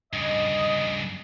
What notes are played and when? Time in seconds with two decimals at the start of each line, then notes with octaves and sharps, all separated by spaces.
0.13 G2 C#3 D#5